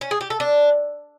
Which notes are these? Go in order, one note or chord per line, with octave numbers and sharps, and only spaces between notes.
C#4
G#4
G4
A4
D4